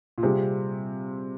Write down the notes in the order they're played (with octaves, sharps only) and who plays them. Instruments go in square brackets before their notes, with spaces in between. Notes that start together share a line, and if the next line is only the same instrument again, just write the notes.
[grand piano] A#2
[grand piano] C3 [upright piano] G3 C4 F4 G#4